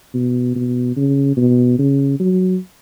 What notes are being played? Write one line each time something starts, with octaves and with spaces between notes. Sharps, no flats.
B2
B2
C#3
B2
C#3
F#3